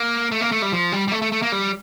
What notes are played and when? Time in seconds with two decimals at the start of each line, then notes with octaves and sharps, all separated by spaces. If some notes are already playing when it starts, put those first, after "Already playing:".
Already playing: A#3
0.31 A3
0.41 A#3
0.52 A3
0.62 G3
0.72 F3
0.92 G3
1.08 G3
1.12 A3
1.22 A3
1.32 A3
1.42 A#3
1.52 G3